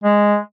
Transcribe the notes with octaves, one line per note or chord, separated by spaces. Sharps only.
G#3